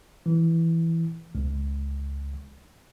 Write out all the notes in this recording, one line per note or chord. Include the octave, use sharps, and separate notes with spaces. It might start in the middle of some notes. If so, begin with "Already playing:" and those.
E3
C#2